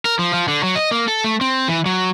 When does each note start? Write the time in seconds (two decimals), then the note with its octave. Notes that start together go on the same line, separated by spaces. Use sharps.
0.05 A#4
0.19 F3
0.34 F3
0.48 D3
0.63 F#3
0.75 D#5
0.91 A#3
1.08 A4
1.24 A3
1.41 C4
1.68 E3
1.86 F#3